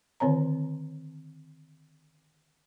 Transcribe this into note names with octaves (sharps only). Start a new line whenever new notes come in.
D3 D#3 C4 C#5 A#5